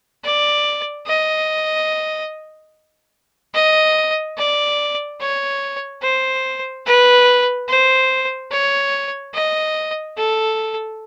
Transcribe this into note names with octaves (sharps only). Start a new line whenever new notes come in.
D5
D#5
D#5
D5
C#5
C5
B4
C5
C#5
D#5
A4